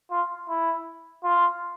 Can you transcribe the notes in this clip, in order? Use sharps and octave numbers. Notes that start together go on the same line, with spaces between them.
F4
E4
F4